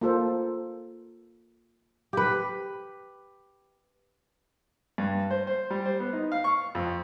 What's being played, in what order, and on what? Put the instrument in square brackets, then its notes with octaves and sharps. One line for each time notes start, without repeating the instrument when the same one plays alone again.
[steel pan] A#3 F4 A4 C5
[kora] G4 B4
[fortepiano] G2
C5
C5
G3
C5
B3
D#4
F5
C#6
F2